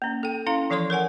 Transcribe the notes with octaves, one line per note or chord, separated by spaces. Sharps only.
A#3 C#4
A4 G5
C#4 E4 A4 F5
E3 F3 A4 C#5 C6 C#6
A#4 C#5 F#5 G#5